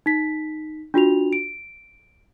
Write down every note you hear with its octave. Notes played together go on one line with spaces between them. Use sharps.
D#4 B6
D4 F4 F#4 F7
D7